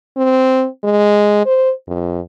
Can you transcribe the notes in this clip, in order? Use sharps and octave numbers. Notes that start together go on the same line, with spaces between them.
C4
G#3
C5
F2